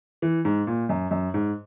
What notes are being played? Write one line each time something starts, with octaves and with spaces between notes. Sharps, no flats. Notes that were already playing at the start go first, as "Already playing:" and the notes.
E3
G#2
A#2
F#2
F#2
G#2